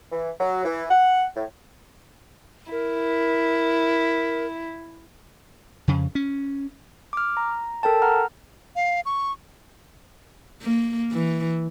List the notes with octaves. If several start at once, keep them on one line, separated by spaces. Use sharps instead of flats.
E3
F#3
E3
F#5
A2
E4 A#4
F2 C#3
C#4
D6 F6
A#5
A4 A#4 G5 A5
F#5 A#5 F6
F5
C#6
A#3
E3